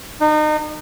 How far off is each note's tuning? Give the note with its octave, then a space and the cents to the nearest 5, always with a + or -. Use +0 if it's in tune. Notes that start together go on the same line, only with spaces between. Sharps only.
D#4 -30